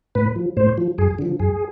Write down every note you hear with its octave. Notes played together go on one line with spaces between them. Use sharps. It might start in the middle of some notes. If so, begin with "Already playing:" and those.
A2 B4
F3
A2 C5
F3
F#2 G#4
D3 F3
F#2 G#4